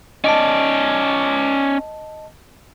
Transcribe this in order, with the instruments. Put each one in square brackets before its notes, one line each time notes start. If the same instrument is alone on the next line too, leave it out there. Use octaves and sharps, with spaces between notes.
[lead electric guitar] C#4 D5 [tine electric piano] D#5 A5